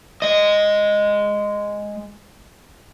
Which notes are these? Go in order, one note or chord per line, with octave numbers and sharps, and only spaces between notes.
G#3 D#5